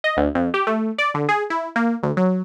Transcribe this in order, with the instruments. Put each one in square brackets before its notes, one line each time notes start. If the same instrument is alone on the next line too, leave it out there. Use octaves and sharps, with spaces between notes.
[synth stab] D#5
D2
F2
G4
A3
D5
D3
G#4
E4
A#3
D2
F#3